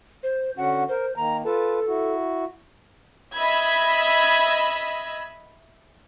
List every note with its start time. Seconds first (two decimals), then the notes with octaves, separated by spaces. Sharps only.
0.23 C5
0.57 D3 C#4 F#4 F#5
0.89 A#4 C5
1.16 D#3 A#3 A#5
1.45 F4 A4 B4 A5
1.87 E4 F#4
3.36 D#5 E5 B5 E6 G#6